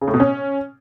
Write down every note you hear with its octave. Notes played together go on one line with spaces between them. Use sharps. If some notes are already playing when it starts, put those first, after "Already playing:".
C#3
A2
B2
C#4